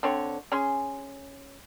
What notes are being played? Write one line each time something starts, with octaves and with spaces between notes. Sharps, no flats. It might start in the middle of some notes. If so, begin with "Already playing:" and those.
D3 C4 C#5
C#4 G#4 C6